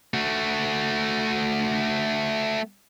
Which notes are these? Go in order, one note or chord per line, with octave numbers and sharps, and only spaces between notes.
A3 F#4